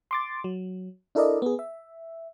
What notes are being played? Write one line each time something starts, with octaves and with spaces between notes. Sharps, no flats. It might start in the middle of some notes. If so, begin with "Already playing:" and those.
C6 D6 A6
F#3
D4 E4 A4 A#4 D5 D#5
B3 G#4
E5